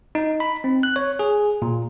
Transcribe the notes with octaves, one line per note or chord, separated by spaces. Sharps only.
D#4
B5
C4
F#6
C#5
G#4
A#2